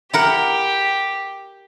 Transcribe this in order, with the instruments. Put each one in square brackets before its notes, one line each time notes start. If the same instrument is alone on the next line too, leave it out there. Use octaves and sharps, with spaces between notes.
[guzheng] E4 A#4 F#5 [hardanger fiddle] G4